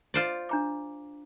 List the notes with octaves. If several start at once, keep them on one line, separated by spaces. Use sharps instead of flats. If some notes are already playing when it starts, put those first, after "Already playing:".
F4 C5 D5
D4 A#5 D6